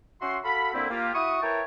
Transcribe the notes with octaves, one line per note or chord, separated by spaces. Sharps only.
C#4 F#4 E5 C6
F#4 A4 F5 B5
D3 A#3 C4 E4
A#3 F4 G4
E4 F#4 B5 C#6 D#6
E4 A#4 B4 C#5 G5 A5